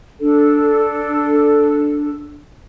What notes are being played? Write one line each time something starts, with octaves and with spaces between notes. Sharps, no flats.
D4 A4